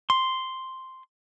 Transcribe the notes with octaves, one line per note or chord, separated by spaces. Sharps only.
C6